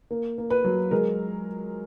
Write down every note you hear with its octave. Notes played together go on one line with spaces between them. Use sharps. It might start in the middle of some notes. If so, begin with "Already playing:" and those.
A#3
A#3
B4
F#3
G#3 A#4